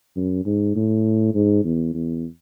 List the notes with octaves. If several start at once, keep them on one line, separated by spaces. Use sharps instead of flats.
F#2
G#2
A2
G#2
E2
E2